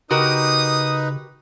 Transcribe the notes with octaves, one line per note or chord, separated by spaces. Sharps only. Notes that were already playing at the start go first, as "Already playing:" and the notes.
C#3 D#4 F#4 G4 A#4 B4 D#6